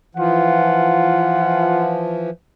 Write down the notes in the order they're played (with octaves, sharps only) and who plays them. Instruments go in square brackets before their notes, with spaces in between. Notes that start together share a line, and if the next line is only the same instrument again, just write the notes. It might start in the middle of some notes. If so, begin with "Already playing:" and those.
[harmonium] E3 F3 [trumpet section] F4 F#5